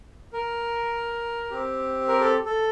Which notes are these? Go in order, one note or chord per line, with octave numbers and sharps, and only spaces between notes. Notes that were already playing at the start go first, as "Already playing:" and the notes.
A#4
C4 G4
A#4
A4
A4